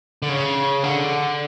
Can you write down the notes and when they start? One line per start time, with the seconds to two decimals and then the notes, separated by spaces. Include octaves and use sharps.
0.23 D3
0.29 C#3
0.84 D3